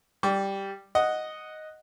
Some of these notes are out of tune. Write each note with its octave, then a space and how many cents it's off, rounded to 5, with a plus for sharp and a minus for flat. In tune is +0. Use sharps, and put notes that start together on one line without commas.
G3 +0 D6 -30
D#5 +0 F#5 +0